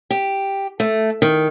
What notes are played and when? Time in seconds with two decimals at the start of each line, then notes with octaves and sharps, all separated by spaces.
0.11 G4
0.80 A3
1.22 D#3